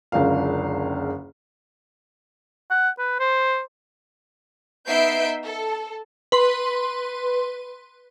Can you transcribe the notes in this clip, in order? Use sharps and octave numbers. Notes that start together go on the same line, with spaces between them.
F#1 C#2 D3 A#4 F5
F#5
B4
C5
B3 D#4 E5 G6 C7 D7
A4
B4 C6